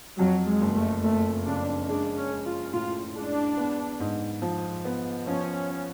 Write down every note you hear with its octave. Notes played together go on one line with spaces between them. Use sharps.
F2 F#3
G#3
F#1
A3
F#1 A3
C#3 D4
G#3 D4
C#4
G#3
F4
A2 F4
G#3 D4
B3
G#2
F3
B3
F3 C#4